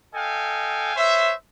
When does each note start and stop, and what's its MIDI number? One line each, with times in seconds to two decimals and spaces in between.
0.14 0.93 69
0.14 0.93 75
0.14 0.93 77
0.14 0.93 79
0.14 0.93 80
0.96 1.33 72
0.96 1.33 73
0.96 1.33 76